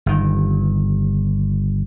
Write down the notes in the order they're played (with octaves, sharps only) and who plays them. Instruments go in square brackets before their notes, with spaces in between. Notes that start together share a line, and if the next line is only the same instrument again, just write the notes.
[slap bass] G1 D#3